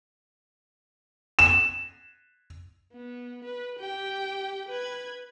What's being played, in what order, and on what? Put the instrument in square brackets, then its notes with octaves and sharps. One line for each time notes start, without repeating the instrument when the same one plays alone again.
[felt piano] E7
[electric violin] B3
B4
G4 G5
B4 G#6